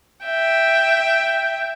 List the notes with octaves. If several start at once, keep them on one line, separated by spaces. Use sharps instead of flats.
E5 G5